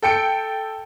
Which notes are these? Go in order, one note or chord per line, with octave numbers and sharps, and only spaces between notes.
A4 G5 C#7 D7